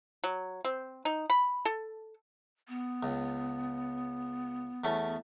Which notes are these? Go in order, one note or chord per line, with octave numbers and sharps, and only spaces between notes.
F#3
C4
D#4
B5
A4
B3
C#2
E2 A3 C#4